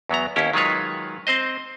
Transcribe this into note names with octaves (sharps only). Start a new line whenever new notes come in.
E2 F#3 B3 A#5
D#2 C#4 E4 G4
D#3 F#3 G#3 F4 B4 C#5
C4 C5 D#5